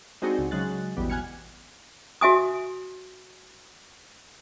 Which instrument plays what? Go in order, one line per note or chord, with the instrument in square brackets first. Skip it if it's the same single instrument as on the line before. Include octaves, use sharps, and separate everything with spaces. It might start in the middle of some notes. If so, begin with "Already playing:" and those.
[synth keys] G#3 C4 D4 D#4 F#4 G#4
C#2
C#3 F#3 G#3 F#6 A6
A1 E2 B2 G3
F#5 G#5 F6 G#6 C#7
[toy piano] F#4 E5 G#5 D#6